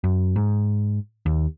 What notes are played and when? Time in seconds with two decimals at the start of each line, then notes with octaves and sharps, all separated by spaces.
0.04 F#2
0.36 G#2
1.26 D#2